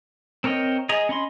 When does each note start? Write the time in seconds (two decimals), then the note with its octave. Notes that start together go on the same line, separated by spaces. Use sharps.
0.44 C4 A#4 C#5 D#5 G5
0.89 G#4 D#5 A#5
1.09 C#4 D#5 B5 C6